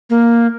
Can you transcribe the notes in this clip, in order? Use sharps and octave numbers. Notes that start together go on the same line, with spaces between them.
A#3